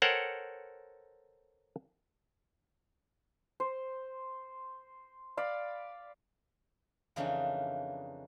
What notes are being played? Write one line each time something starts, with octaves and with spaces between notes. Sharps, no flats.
A4 A#4 C5 C#5 F#5 G5
C5
D5 F5 B5
F2 C#3 E3 A#3 D4 D#4